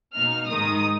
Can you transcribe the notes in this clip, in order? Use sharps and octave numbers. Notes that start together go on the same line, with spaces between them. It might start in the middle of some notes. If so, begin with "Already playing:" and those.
B2 A#3 D#4 F6
G#2 D#3 G#3 D#4 D#6